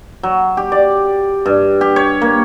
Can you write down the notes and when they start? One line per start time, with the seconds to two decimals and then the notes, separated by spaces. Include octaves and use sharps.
0.23 F#3
0.57 G4
0.72 D5
1.46 G2
1.81 G4
1.96 C#5
2.22 A#3